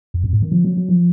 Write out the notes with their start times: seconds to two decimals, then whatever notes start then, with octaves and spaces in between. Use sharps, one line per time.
0.14 F2
0.24 F#2
0.33 G#2
0.42 D#3
0.52 F3
0.65 F#3
0.77 F#3
0.89 F3